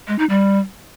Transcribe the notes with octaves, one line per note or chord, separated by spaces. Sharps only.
G#3
D#4
G3